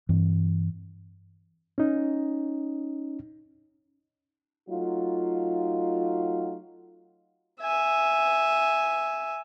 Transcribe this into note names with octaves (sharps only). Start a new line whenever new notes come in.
G2 E3 C4
C#4 D#4
F#3 A3 D#4 F4
E5 G#5